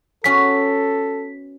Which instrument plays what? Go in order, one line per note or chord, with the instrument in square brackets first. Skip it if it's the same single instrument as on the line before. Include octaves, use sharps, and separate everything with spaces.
[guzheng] B3 C#4 F#4 [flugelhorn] A4 [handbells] B6